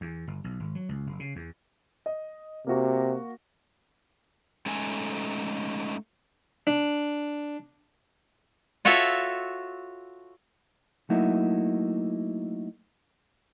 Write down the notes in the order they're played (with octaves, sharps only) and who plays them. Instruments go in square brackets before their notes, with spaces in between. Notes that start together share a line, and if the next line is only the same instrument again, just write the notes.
[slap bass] E2
G1
B1
G#1
F#3
C#2
F#1
C#3
E2
[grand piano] D#5
[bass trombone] C3 [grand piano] A#3 F#4
[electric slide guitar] G#3 A3 C#4 D#4 A4 G#5
[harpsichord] D4
[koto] F4 F#4 A4 C#5 E5
[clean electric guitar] F#3 A3 A#3 D#4 E4 F#4